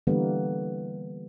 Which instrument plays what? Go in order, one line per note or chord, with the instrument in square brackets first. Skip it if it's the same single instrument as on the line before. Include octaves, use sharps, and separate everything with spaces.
[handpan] D3 E3 G3 A#3 B3